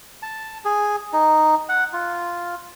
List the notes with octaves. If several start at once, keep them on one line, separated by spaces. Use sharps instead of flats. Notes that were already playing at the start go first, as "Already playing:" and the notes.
A5
G#4
D#4
F#5
F4